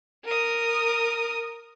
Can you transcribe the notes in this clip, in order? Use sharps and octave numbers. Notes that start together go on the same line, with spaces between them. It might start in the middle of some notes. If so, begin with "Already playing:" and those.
A#4 D#6